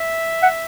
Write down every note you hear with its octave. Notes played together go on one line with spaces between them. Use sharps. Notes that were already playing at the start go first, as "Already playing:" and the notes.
Already playing: E5
F#5